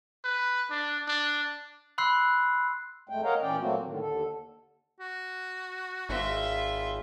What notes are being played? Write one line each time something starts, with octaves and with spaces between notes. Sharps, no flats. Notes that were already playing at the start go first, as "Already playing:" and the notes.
B4
D4
D4
B5 C6 E6 F#6 C7
F2 G#3 A3 G5
A#4 C#5 D#5 F5 F#5 A#5
A#2 E3 C#4 D5 G5
A#2 F#3 A3 A#3 C4 F#4
A2 D3 D#3
D#2 D3 A4
F#4
G#1 F4 E5